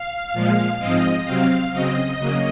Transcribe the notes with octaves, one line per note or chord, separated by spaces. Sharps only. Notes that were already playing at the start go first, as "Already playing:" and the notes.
Already playing: F5
A#2 F3 G#3
G#2 F3 G#3 C4 D#5
C3 F#3 C4 F5
C#3 F#3 C4 D#5
C#3 F#3 A#3